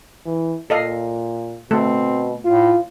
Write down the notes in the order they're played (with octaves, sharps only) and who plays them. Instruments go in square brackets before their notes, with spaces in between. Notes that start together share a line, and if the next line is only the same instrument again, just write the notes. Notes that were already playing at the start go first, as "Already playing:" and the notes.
[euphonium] E3
[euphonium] A#2 [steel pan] A4 D#5 F5
[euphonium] B2 [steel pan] A3 A4 [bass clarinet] C4
[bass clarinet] A2 [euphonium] F4